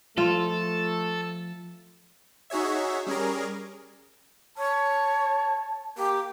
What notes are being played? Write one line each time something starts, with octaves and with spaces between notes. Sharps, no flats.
F3 A3 F4 A4
D#4 F#4 G#4 C#5 E5
G3 C#4 G#4 A#4
C#5 A5
A#3 G4